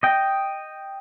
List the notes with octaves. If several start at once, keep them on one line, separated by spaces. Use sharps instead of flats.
D#5 G5